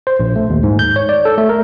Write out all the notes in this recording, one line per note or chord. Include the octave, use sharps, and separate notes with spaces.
C5
A#1
A3
D#2
G#2
G6
C#5
D5
A4
A3
A#4